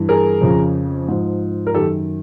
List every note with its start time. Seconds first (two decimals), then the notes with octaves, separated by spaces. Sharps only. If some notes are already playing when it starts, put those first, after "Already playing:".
Already playing: G2 E3
0.09 G#4 A#4
0.41 F2 C#3 F3
1.08 G#2 F3
1.67 A#4
1.74 F#2 D#3 G4 A4